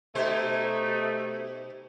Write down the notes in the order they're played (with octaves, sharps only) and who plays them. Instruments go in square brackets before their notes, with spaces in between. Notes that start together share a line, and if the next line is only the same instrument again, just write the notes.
[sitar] B2 G4 C5 [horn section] A3 D#4